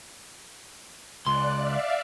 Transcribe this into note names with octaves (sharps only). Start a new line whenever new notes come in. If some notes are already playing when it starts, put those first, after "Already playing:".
C#2 D5 C6 F#6
D5 E5 F5